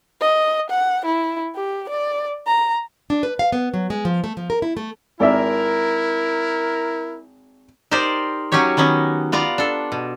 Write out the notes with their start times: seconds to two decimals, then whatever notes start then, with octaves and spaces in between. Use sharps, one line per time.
0.21 D#5
0.70 F#5
1.06 E4
1.56 G4
1.89 D5
2.47 A#5
3.10 D4
3.23 B4
3.39 F5
3.52 B3
3.74 F#3
3.90 G#3
4.05 F3
4.24 A3
4.37 F3
4.50 A#4
4.62 E4
4.77 A3
5.20 G#1 E4 A#4 D5 E5
7.91 D#4 G4 A#4 C5 D5
8.52 F#3 C#4 D#4 G4 C#5
8.77 D#3 B3 C#4 D#4
9.32 B3 F4 D5 A#5
9.58 D4 A4
9.92 B2